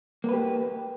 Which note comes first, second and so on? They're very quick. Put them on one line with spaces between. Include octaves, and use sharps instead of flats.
A#3 B4 G4